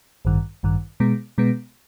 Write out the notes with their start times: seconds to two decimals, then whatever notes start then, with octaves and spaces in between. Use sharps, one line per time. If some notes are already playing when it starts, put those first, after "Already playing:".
0.25 A1 G2 D#3
0.63 A1 G2 D#3
1.00 B2 G#3 B3
1.38 B2 G#3 B3